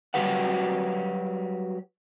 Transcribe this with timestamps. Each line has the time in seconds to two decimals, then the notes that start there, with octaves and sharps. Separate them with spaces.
0.14 F#3 G3 F#4 G4 B4 F#5